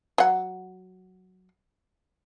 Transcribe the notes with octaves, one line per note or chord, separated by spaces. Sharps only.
F#3 F#5